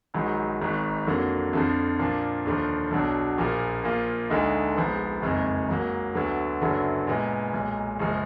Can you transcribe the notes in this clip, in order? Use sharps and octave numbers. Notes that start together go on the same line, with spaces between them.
A#1 G#2 D#3 F#3
G#1 G#2 D#3
F2 D3 F#3 A#3
F2 D3 F3
A#2 F3 A#3 D4 F4
D#2 D3 F3
B1 B2 F#3 D4
A#1 A#2 F3 A#3
A#2 F3 A#3 F4
D2 D3 G#3 D#4
A#1 G#2 F3 B3
F#1 F2 D#3 G#3
G#2 F#3 A#3
D2 D3 F#3 B3
F#1 F#2 D3 F#3 B3
A#2 G#3 B3
B1 A#2 G#3
F#1 F3 G#3